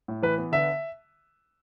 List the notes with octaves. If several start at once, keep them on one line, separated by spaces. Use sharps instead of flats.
A2
E3 B4
B3
D3 E5